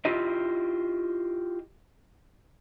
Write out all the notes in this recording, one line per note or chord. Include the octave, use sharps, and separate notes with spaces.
E4 F4 G4 D#5